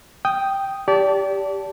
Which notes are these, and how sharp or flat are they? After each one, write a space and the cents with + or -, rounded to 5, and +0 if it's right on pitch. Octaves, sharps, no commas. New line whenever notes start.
G5 +0 D#6 +0
G4 +0 D5 -30 A5 +0